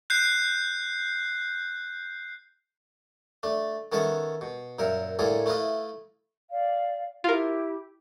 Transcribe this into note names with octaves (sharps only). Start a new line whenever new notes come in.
F#6 G6 C7
A3 D4
D#3 B3 C#4 A4 E5 F#5
B2
F#2 A#2 A#4 E5
A2 D3 A#3 G#4 A4
A3 E4 F4 B4 D#5
D5 F5
E4 F4 G4 A#4